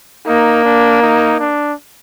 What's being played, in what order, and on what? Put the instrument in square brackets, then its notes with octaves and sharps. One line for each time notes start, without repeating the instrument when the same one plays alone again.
[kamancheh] A#3 [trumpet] D#4
[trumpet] D4
D#4
D4